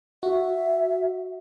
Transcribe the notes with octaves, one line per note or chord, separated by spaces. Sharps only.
F#4 E5